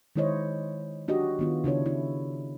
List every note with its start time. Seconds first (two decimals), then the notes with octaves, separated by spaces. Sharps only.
0.16 D#3 G#3 E4 C5 C#5 D#5
1.08 D4 F#4 G4 D#5
1.39 D#3 B3 F4
1.64 C#3 D4 E4 C#5
1.86 E4